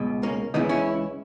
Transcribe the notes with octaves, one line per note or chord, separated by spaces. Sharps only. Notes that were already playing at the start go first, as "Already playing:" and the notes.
Already playing: C#2 B2
A#3 C#4
C#2 C#3 E3 B3 D#4
C#4 E4